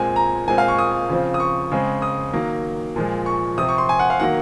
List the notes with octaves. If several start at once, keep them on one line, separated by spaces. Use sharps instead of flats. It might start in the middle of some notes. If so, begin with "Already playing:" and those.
Already playing: A#2 G#3 C4 G#5
A#5
A#2 G#3 C4 G#5
F5
C#6
D#6
C#3 F3 C4
D#6
C#6
C#3 G#3 C4
D#6
D#3 F#3 A#3
A#2 F3 G#3
C#6
C3 F3 C4 D#6
C#6
C6
G#5
F#5
F5
D#3 F#3 A#3 F#5